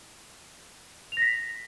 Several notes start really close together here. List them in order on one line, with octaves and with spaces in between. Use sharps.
F7 A#6 B6